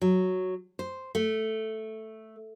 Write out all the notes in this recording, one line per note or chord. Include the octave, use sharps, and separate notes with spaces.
F#3
C5
A3